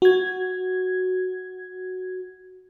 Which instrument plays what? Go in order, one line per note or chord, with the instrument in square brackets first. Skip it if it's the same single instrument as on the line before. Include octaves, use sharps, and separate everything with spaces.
[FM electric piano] F#4 G#6